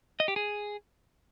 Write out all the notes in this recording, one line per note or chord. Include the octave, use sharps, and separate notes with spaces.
D#5
G4
G#4